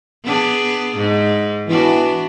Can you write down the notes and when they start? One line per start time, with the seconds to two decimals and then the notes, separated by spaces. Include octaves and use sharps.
0.24 B3 D4 G#4
0.96 G#2
1.67 E3 B3 D4 F#4